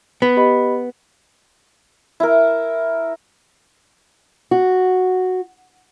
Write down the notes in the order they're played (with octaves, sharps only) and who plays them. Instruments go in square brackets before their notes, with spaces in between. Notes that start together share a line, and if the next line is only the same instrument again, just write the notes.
[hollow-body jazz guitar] B3
[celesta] G4 D#5 B5
[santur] E4 A#4
[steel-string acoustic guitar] F#4